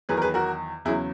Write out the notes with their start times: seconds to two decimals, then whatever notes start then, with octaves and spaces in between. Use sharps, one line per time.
0.09 E2 D#3 F#3 G#4 B4
0.17 A#4
0.22 G#4 B4
0.34 F#4 A#4
0.85 E2 C#3 F#3 E4 G#4